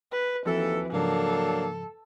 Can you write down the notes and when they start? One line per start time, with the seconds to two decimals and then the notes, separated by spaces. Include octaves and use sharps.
0.12 B4
0.46 D#2 E3 F3 C4 F#4 A4
0.92 G#2 C#3 F3 F#3 A#3 D4 A4